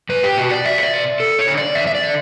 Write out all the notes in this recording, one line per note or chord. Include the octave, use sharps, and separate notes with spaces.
E2 B4
G4
B2 F#4
D5
E2 E5
C#5
D5
B2
E2 A4
C#5
D3
D5
E2 E5
E5
D5
D3